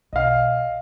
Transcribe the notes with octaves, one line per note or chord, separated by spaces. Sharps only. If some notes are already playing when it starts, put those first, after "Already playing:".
B1 D#5 F5